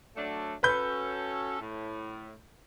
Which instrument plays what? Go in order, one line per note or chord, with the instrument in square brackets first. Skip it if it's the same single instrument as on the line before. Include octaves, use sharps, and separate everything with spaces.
[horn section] F#3 A3 D4
[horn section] C#4 F#4 A4 [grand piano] B4 B5 G6
[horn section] A2